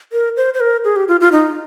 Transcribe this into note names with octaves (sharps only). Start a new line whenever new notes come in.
A#4
C5
C5
A#4
G#4
G4
F4
F4
D#4